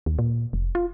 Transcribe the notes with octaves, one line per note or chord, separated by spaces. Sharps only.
D#2
A#2
F1
F4